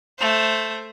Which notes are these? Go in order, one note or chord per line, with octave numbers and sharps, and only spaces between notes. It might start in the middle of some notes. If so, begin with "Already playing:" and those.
A3 C5